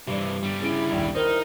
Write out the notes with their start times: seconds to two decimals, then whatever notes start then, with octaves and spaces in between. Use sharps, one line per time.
0.08 G2 C3 E3 D5
0.43 D3 G3
0.61 C#3 E4 G#4 D7
0.92 A#1 D#2
1.15 D#4 E4 A#4 C5